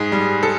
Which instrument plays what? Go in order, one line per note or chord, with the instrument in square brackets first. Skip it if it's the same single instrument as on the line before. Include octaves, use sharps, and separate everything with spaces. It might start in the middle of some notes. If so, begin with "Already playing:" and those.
Already playing: [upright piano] G#2 G#4
G3
A4